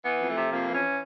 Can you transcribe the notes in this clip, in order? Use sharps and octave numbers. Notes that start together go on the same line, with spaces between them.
E3 B3
F2
A3
C3
F2 A#3
E3
C#4